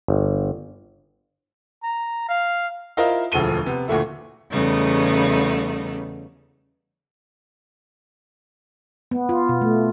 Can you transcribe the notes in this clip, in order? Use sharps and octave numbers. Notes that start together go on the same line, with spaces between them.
G1
A#5
F5
E4 F4 A#4 C5 D#5 F5
E1 D2 F3 A3 D#7 G7
C3 B3
D2 A#2 A3 E4
E2 C#3 G3 A3 B3 D#4
B3
F4
B2
A3